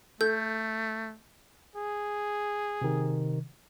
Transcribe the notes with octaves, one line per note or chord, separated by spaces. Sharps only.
A3 A4 G6
G#4
C3 D#3